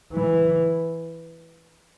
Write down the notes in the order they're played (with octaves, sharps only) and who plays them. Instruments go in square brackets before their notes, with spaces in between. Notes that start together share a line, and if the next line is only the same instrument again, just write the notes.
[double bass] E3